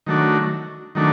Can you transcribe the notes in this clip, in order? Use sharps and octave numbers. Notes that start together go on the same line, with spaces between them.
D#3 F#3 A3 D4 F#4
D#3 F#3 A3 D4